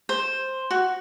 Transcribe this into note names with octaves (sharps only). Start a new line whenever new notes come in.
C5
F#4